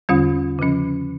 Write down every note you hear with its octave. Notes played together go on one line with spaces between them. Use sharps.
E2 D3 G3 C#4 F4
C#3 F3 C#4